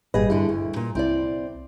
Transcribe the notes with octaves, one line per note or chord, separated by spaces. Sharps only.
G#1 A#2 G3 G#4 B4 D#5
G2 D3 E4 G#4
D2
A#2
C2 C4 E4 D5